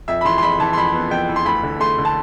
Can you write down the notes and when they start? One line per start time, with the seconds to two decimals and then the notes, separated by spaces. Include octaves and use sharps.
0.08 F2 E5
0.21 B5
0.25 E3 C6
0.38 C6
0.43 F2 B5
0.60 E3 A5
0.73 C6
0.77 F2 B5
0.94 B3
1.11 F2 G5
1.29 E3
1.36 C6
1.45 D2 B5
1.63 D3
1.80 A3 C6
1.98 D3
2.05 A5